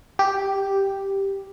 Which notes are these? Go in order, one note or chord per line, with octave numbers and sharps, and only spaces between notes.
G4